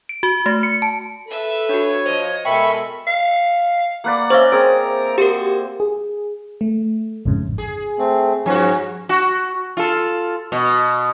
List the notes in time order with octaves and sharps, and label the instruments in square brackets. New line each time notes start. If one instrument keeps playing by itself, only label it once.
[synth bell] D7
F#4
A3
C#7
A5
[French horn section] A4 [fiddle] B4 E5
[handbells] D4 F#4 [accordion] C#5
[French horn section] F3 [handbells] C5 [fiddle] D#5
[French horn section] B2 A#4 [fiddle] G#3 A4 [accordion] E5 B5 C#6 [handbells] G5
[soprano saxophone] F5
[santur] A#3 B4 D5 [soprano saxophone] F#5
[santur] C#4 D5 E5 [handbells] C5 F5
[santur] C4 G#4 [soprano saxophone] A#4
[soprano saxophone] F#4 [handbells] G4 A#4
[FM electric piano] G#4
A3
A1 F2 G#2 C#3
[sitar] G#4
[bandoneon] A3 C4
[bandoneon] G#2 C#4 [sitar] F3 F4 F#4
[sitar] F#4
F4 A4
B2